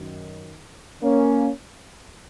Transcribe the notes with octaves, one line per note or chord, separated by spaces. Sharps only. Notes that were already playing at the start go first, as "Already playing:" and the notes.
Already playing: F#2 D#3
A#3 C#4